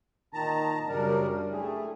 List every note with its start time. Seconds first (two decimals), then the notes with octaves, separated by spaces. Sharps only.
0.33 A#2 D#3 D#4 A5 A#5
0.89 F#2 C#3 G3 D4 A#4
1.50 A3 E4 G4 G#4